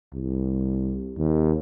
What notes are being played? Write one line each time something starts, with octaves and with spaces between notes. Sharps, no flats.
C2
D#2